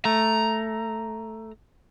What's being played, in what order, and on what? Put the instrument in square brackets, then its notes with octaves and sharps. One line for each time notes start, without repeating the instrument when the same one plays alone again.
[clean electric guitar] A3 [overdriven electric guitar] A#5